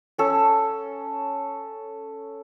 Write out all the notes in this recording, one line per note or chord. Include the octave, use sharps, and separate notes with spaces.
C#4 A4